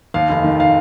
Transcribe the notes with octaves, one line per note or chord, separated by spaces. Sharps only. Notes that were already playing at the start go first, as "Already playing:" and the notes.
D#2 F5
F1
D#3
F5